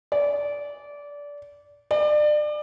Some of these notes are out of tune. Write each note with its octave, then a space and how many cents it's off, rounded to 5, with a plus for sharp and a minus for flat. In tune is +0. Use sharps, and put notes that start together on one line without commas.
D5 -20
D5 +30